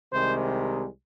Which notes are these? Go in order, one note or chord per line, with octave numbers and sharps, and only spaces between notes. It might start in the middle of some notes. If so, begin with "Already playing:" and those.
C2 C3 D#3 G#3 C5